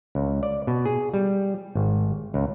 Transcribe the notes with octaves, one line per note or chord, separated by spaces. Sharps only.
C#2
D5
B2
G#4
G3
G#1
C#2